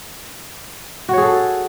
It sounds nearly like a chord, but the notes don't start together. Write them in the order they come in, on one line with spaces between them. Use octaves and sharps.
F#4 C#5 G#4 A4